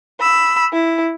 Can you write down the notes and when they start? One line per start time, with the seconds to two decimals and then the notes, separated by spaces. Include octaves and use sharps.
0.20 B5 E6
0.73 E4